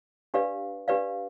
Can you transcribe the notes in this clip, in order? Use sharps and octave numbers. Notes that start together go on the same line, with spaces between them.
D4 G4 B4 D5 F5
D4 G4 B4 D5 F5